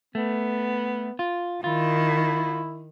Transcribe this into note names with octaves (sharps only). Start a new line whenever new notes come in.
A3 B3
F4
D#3 E4 F4